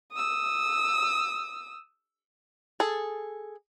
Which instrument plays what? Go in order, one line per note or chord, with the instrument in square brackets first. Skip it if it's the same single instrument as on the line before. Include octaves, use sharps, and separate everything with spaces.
[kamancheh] D#6 E6
[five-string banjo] G#4 A4